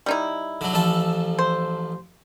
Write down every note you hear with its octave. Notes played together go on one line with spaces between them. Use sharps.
G3 D#4 E4
D3 F#3
A1 F3 A4
C5